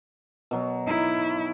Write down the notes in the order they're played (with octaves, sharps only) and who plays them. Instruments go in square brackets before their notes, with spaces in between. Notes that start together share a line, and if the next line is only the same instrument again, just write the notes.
[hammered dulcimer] B2 F#3
[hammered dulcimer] D#4 [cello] E4